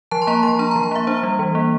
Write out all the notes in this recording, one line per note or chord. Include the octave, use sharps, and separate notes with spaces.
F3 A5
C6
A#3 A#5
F3 C6
D4 A#5
A#5
F3
A#5
A#3 E5
D4 C5
G3
E3
A#3